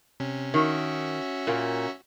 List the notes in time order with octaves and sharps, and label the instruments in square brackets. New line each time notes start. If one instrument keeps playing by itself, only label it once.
[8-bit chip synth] C3 C#4
[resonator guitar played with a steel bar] D#3 [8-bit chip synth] C#4 F#4 E5
[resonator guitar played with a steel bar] A#2 A#3